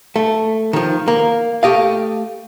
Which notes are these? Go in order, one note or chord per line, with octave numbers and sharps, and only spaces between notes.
A3
D#3 F3
A#3
A3 G4 D#5 F5